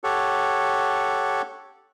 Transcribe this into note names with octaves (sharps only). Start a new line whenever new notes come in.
G4 A4 C#5 F#5